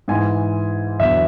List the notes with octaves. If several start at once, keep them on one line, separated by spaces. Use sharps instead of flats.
G#2 E3 G#5
E2 D3 F#3 E5